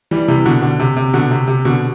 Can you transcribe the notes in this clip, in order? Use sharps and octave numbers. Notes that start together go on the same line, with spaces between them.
E3 G3
C3 E3
B2 D3
B2 D3
C3
C3
B2 D3
C3
C3
B2 D3